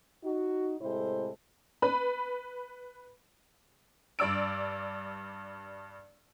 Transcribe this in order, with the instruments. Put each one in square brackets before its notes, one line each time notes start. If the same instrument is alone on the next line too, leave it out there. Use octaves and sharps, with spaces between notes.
[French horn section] D#4 F#4
A2 C3 G#3 E4 A4 C5
[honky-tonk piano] B4 B5
G2 D5 E6 D7